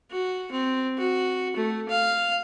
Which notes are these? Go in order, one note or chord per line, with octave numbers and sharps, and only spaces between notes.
F#4
C4
F#4
A3
F5